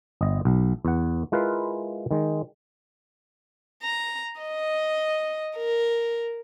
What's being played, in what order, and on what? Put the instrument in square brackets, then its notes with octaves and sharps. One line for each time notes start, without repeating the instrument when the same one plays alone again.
[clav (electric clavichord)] G1 D#5
B1
E2 F#5
G#3 E4 F4 A#4 B4 F5
D#3 G#3
[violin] A#5
D#5
A#4